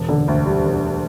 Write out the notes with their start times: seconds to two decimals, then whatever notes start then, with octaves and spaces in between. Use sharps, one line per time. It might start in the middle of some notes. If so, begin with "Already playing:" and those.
Already playing: E1
0.09 D3
0.28 D2
0.46 G3
0.65 E1